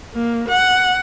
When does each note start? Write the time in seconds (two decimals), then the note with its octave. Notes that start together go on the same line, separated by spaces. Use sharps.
0.14 A#3
0.49 F#5